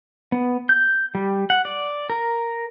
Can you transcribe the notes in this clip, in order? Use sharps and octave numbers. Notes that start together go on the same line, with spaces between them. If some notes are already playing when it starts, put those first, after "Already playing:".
B3
G6
G3
F#5
D5
A#4